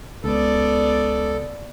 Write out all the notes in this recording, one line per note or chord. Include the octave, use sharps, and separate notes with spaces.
C#2 B3 A4 D5